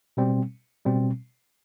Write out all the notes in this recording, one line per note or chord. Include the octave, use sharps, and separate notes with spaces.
B2 G3 C4
B2 G3 C4